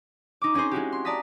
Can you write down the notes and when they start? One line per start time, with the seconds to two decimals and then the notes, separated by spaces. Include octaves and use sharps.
0.42 D#4 D6
0.54 C4 C#4 D#4 G#4 C5
0.71 G#3 E4 F#4 G4
0.92 C6
1.05 D5 A5 A#5 D#6 B6